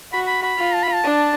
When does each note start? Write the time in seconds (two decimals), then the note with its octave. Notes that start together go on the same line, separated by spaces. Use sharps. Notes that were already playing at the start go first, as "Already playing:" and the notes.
0.13 F#4 B5
0.27 B5
0.43 B5
0.58 F4
0.74 A5
0.83 B5
0.94 A5
1.04 D4